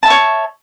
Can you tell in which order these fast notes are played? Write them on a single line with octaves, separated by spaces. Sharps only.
A5 E5 C#6 C#5